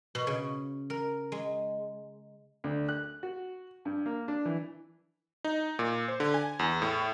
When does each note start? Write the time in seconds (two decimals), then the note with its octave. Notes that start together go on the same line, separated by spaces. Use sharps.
0.15 B2
0.27 C#3
0.90 A#4
1.32 G#3
2.64 D2
2.89 F#6
3.23 F#4
3.85 G2
4.06 A#3
4.28 D4
4.45 E3
5.44 D#4
5.79 A#2
6.08 C5
6.20 D3
6.34 G#5
6.59 E2
6.82 A2